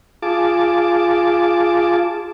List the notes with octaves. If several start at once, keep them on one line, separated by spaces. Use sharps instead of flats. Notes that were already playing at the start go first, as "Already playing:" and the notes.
F4 G#4 A5 D6